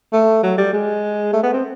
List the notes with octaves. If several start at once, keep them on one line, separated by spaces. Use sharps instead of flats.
A3
F#3
G3
G#3
A3
B3
C4